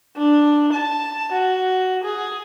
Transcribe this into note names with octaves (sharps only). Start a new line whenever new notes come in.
D4
A5
F#4
G#4